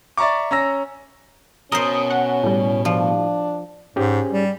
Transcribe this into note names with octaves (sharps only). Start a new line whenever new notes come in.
D5 E5 A#5 C#6 D6
C#4 A#5 E6 A#6
B2 C#4 A#4 C5 D#6
F#5
A2 G3
F3 D4
G#2 C#4 G4 G#4
G3